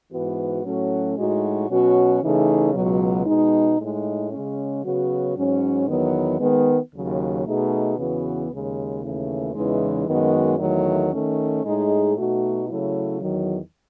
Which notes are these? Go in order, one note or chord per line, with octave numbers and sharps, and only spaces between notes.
G#2 E3 B3 F#4
A2 F#3 A3 C#4 F#4
A2 G#3 D#4 F#4
B2 F#3 C#4 F#4
C#3 E3 A3 D#4 G#4
C#2 B2 F#3
B2 G#3 D#4
A2 G#3 D#4
C#3 G#3 C#4
C#3 F#3 B3 F#4
G#2 F#3 C#4
E2 D#3 F#3 B3
D#3 G#3 B3
D#2 C#3 F#3
B2 A3 D#4 G#4
E2 C#3 E3 B3 F#4
D#2 C#3 G#3
D#2 C#3 E3 A3 E4
E2 C#3 E3 G#3 D#4
F#2 D#3 G#3 B3 F#4
E2 D#3 F#3 A3
D#3 A3 C#4
A2 G#3 D#4 G#4
B2 A3 D#4 F#4
C#3 F#3 A3 E4
E2 D#3 F#3